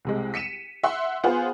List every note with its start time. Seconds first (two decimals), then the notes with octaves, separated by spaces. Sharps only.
0.05 C2 C3 G#3
0.34 B6 C#7 D#7 E7
0.83 E5 F#5 C6
1.24 B3 F4 G#4 C5 F#5